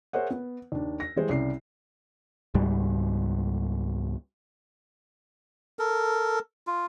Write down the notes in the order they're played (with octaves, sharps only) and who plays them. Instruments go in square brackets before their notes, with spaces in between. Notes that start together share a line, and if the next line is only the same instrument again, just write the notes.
[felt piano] G#4 A#4 C5 C#5 E5 F#5
B3
D#2 D4
A#6
E3 G3 G#3 C5
C2 C#3 D5 C7
[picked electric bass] C#2 G#2 G3
[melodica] A4 A#4
F4